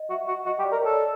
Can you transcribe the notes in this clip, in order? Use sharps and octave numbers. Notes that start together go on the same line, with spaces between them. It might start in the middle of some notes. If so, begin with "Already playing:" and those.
Already playing: D#5
F#4 E5
F#4
F#4 D#5
G4
D5
A#4
A4 C#5
D5